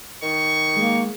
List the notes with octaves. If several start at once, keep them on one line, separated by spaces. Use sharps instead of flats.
D#3 C#6
G#3 A#3